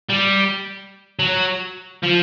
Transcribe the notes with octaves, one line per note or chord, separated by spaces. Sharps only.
G3
F#3
F3